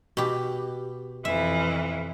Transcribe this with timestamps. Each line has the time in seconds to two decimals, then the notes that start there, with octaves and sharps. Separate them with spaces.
0.17 B2 G4
1.25 F2 E3 E5